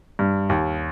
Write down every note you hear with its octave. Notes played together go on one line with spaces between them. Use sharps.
G2
D#2